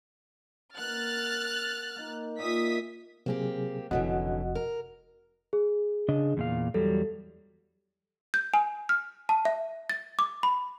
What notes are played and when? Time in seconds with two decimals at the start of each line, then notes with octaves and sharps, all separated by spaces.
0.77 A#3 E5 F#5 F6 F#6 A6
1.96 A#3 D#4
2.39 A#2 E5 D#6 B6
3.26 C3 F#3 A#3 C4 G4 G#4
3.91 F1 F#2 D3 E3 F#4 D#5 F#5
4.55 A#4
5.53 G#4
6.08 C#3 D4 D#5
6.37 E2 A#2 F5
6.74 E2 F#3 G3 A4
8.34 G6
8.54 G#5
8.89 F6
9.29 A5
9.45 E5
9.90 A6
10.19 D6
10.43 B5